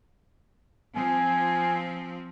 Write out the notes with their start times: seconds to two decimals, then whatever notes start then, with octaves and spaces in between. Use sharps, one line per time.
0.96 F3 C4 G#5